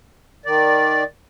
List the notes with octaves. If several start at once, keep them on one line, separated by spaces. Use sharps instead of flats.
D#3 D5